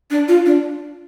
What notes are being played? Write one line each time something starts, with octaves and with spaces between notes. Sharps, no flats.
D4
F4
D4